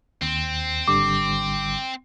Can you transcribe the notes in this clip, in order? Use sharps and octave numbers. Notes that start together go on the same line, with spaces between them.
D#2 C4
G#1 D3 G3 D6